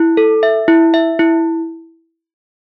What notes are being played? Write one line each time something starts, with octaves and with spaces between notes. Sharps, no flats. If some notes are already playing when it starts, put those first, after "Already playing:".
Already playing: E4
A4
E5
E4
E5
E4